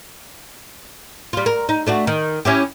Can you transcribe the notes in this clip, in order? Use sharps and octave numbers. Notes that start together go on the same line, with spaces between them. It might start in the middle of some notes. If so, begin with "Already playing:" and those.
G3 F4
A#4
D#4
A3 D4 F#4
D#3
C#4 E4 G4